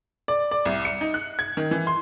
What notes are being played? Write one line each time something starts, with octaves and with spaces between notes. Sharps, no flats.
D5
D5
C2
C#7
D#4
F#6
G#6
D#3
E3
C6